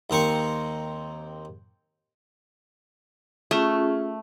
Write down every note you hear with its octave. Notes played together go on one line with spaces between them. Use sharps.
D#2 C4 A#4 C#6
A3 C#4 F4 G#4